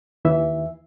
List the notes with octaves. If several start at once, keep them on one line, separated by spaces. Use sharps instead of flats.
D#2 E3 E5